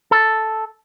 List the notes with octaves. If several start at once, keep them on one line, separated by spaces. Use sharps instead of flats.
A4